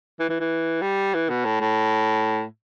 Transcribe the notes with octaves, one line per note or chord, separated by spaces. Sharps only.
E3
E3
E3
G3
E3
B2
A2
A2